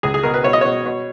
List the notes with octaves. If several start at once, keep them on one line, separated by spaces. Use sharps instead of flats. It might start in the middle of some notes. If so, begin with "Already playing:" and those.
C#2 G#4
G#4
B2 A#4
B4
B2 C#5
D#5
B2 C#5
B2